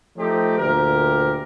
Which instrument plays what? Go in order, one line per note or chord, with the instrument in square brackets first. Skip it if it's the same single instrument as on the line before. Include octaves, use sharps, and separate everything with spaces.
[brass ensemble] F3 A3 C4 D#4 G4
D2 A#2 G4 A#4